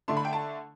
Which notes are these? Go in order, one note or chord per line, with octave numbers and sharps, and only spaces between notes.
D3 A3 D4 C6
B5
G5
A5